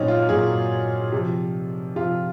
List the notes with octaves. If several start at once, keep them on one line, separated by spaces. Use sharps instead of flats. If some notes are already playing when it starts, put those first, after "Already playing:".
Already playing: A#2 F#3 C4 C#4 D#4
F4
A#2 F#3 G#4
C3 F3
C3 F3 F4